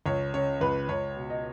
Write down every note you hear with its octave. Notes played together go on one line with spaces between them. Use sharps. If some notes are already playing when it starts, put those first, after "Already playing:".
C#2 C#5
C#3 C#5
C#2 B4
C#2 C#5
B2
D#5